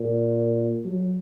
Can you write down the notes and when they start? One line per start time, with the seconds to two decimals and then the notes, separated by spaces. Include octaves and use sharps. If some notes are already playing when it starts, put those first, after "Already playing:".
Already playing: A#2
0.85 F#3